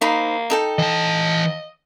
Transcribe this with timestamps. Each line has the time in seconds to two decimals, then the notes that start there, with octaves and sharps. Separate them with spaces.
0.01 A#3 D#4 C5 B5
0.50 D#4 A4 G5
0.79 E3 D#5 A5